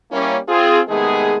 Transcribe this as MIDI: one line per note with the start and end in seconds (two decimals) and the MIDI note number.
0.12 0.38 55
0.12 0.38 58
0.12 0.38 61
0.12 0.38 64
0.48 0.80 60
0.48 0.80 65
0.48 0.80 68
0.89 1.38 48
0.89 1.38 51
0.89 1.38 56
0.89 1.38 57
0.89 1.38 59
0.89 1.38 68